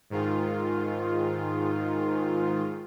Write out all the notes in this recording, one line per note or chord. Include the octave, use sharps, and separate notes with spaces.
G#2 D#3 F4